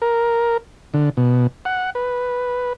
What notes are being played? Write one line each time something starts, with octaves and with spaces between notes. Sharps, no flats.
A#4
D3
B2
F#5
B4